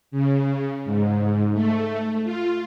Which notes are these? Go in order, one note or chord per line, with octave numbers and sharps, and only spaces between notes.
C#3
G#2
A3
F4